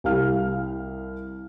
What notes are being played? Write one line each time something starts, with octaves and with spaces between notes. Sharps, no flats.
C2 G4 F5 F6